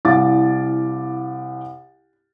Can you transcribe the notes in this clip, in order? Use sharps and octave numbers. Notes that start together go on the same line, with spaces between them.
C2 E4 F5 D6 A6